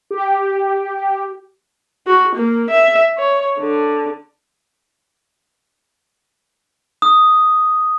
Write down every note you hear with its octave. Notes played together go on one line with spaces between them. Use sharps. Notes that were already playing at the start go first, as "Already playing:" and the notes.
G4
F#4
A#3
E5
C#5
D3
D#6